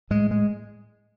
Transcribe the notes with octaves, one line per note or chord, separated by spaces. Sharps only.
A2 G#3
G#3